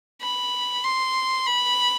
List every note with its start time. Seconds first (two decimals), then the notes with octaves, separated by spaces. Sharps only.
0.22 B5
0.84 C6
1.47 B5